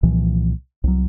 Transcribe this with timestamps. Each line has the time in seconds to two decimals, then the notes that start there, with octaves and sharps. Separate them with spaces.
0.03 C2 A#2 E3 F3
0.84 C2 F#3